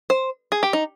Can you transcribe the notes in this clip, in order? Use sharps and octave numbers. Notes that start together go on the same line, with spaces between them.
C5
G#4
G4
D#4